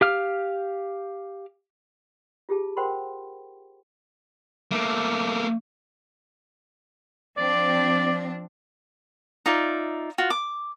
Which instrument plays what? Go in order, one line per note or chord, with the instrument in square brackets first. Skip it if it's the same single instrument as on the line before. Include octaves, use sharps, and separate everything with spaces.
[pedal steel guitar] G4 F5 F6
[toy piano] F4 G4 G#4 A5
A#4 C5 F#5 G5 B5 C6
[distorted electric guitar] A3 A#3
[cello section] F3 C4 D4 [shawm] D5
[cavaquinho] D#4 F4 D5 E5
F4 F#4
D6